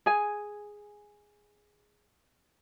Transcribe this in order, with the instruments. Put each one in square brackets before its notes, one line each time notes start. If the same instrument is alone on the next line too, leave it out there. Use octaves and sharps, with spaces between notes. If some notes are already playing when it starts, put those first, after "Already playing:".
[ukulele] G#4 G#5